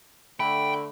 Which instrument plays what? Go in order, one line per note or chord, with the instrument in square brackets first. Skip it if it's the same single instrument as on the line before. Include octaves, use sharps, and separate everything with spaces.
[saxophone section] D3 A3 [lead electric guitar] G5 [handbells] B5